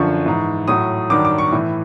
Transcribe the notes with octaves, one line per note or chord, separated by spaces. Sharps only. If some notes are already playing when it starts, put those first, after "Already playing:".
Already playing: F#2 D3 F3 C#6
G#2 E3
A2 F#3 D#6
G2 D#3 F#3 D6
D6
C#6
A2 E3